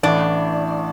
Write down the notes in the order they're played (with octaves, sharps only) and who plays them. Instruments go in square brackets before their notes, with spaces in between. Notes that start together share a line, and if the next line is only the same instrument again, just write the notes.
[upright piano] A1 A2 E3 [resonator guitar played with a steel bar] D4 D5